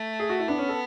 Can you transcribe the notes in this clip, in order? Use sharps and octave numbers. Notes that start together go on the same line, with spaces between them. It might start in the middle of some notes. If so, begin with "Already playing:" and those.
Already playing: A3
G#4
F#4
E4
B3 D4
C#4
A4